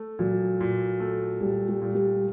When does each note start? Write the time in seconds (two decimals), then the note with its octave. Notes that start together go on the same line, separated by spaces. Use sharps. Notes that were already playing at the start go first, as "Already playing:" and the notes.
Already playing: A3
0.19 A#2 F#3
0.61 A#2
1.00 A3
1.41 A#2 G3
1.68 G3
1.82 A#2
1.95 G3